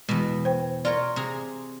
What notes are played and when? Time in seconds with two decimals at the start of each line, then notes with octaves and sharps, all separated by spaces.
0.09 E2 B2 G#3
0.45 C5 G5
0.85 F4 A#4 C#5 D5
1.16 C3 G#4 A#5